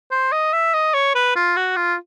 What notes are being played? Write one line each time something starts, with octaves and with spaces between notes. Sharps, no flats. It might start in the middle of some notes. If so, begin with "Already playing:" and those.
C5
D#5
E5
D#5
C#5
B4
F4
F#4
F4